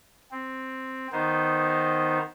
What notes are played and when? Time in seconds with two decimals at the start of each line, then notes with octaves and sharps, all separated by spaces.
0.32 C4
1.12 D#3 B3 D#4 C5